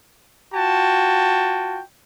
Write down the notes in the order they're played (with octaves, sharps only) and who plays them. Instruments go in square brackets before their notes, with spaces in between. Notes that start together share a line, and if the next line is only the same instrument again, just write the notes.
[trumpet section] F4 F#4 G5 A5